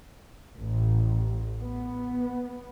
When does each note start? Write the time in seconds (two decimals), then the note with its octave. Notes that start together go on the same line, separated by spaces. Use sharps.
0.57 A1
1.60 B3